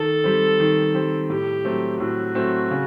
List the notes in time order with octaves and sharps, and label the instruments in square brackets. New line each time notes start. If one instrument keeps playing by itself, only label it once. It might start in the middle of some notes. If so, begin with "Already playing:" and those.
Already playing: [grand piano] D#3 [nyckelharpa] A4
[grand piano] G3 C4
D#3
G3 C4
[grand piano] A2 [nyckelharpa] G4
[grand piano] F#3 A3 C4
[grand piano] A2 [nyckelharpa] F#4
[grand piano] F#3 A3 C4
C#3